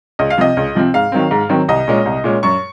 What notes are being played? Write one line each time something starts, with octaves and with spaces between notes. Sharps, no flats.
C#2 D#5
F5
C3 F3 C4 D#5
C#2
C3 F3 C4
G#2 F5
D#3 F#3 C4
G#2
D#3 F#3 C4
C2 D#5
A#2 G#3 C#4
C2
A#2 G#3 C#4
F#2 C#6